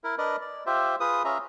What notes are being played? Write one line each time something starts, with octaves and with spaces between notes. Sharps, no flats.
E4 A#4
D4 A#4 B4 D5 D#5
D5
F4 G4 C5 E5
F4 G#4 B4 D#6
C#4 F4 G#4 E5 A#5